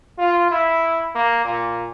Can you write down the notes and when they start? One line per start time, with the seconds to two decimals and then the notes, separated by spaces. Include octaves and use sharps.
0.18 F4
0.51 E4
1.15 A#3
1.45 A#2